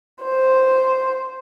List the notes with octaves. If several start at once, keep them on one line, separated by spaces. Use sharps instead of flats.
C5